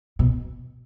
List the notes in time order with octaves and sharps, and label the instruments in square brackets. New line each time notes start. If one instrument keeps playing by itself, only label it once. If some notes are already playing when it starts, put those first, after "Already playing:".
[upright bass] B2